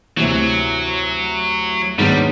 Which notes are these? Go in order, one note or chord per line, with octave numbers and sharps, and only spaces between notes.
D2 C3 E3 F#3
G#2 D#3 F#3 G3 B3 D4